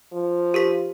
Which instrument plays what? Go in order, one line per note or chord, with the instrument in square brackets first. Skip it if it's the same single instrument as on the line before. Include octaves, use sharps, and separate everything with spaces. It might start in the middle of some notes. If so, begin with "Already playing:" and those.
[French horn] F3
[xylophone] G4 A#4 B6